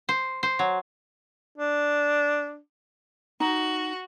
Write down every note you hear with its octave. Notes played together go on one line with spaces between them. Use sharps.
C5
C5
F#3
D4
D#4 F#4